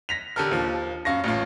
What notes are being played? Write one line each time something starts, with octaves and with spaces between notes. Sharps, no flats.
A#6 B6 F7
D3 G4 A4 A#4 F6
D#2 F3
F#2 F5 C#6 A#6
A1 A2 F4